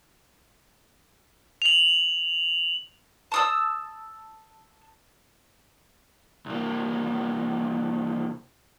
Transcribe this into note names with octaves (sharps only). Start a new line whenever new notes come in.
F7 F#7
A5 D#6 E6
C2 A#3